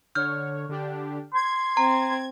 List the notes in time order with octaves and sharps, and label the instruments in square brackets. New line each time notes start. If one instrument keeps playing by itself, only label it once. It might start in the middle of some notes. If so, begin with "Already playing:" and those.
[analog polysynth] D3 C#5 [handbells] F6 G6
[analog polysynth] D3 D4 G4
[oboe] C6 [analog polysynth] G#6
[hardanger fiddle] C4 [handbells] A#5